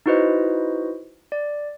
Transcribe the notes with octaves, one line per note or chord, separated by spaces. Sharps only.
D#4 E4 F#4 B4 C5 D#5
D5